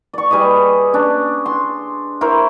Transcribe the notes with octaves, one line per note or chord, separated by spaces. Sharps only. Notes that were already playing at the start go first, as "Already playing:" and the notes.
D5 C#6
G3 G#4 B4 D#5
C#4 D4
C6
E4 A#4 C5 C#5